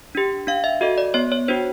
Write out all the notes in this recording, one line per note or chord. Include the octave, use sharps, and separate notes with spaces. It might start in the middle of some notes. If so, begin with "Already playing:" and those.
D4 G4
D4 F5
E5
F#4 A4 D#5
D5
B3 C#5
C#5
D4 F#4 C5